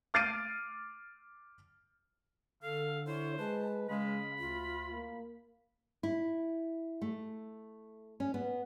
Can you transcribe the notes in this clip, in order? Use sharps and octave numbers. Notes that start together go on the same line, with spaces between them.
D6 F6 A6 C7 D7 D#7
D3 A4 F5
E4 C5 C#5
G#3 B4 A5
C#3 G#3 F5 B5
D2 F4
A#3
E4
A3
C#4
B3